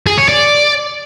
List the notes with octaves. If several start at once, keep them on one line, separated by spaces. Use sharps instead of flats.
G#4
C#5
D5